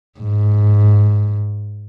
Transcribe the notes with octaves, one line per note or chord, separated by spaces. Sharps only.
G#2